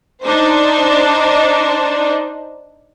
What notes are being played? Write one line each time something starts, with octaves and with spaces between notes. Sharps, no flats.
D4 D#4 C5